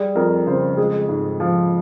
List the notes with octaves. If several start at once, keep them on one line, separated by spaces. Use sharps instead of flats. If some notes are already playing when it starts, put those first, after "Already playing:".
Already playing: G3 G#4
F2 A#4
C#3 C5
G#3 G#4
G#2
F3